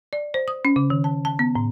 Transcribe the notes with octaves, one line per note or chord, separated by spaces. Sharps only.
D5
C5
D#6
C#4
C#3
D#3
A5
A5
B3
A2